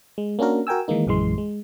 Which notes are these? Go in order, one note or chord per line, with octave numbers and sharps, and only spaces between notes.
G#3
A#3 C#4 D4 F#4 A#4
F#4 A#4 G5 G#5 E6
D#3 E3 G#3 A#3 D#4
A#1 F#2 E3 G#3 C6
G#3